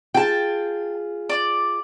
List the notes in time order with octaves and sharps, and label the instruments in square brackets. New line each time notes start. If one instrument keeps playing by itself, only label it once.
[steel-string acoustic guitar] F4 G#4 [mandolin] G5 A5
[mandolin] D5